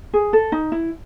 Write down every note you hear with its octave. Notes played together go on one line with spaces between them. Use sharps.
G#4
A4
D#4
E4